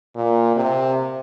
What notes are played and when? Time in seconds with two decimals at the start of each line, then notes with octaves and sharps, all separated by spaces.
0.16 A#2
0.56 C3